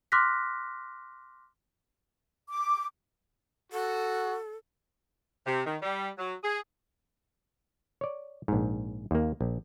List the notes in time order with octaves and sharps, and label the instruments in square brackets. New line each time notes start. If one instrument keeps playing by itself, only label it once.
[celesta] C6 D6 F6 F#6 A#6 B6
[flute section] D6
[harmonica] F#4 [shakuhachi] A4
[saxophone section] C3
D#3
G3
F#3
G#4
[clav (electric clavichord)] C#5 D5
A#1 G#2
D#2 A#3
A#1